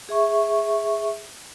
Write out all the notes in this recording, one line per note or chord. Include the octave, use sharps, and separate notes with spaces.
G#4 E5 C#6